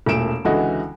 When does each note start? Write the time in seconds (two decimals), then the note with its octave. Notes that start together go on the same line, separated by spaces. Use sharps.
0.06 E1 A#2 A3 D7 E7
0.45 C#2 D3 E3 F#4 D#5